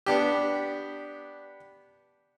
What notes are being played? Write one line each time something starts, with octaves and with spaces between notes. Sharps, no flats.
B3 D4 G4